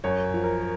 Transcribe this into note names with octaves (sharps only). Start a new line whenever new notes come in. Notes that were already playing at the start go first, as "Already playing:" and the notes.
F#2 C#5
F3
A#4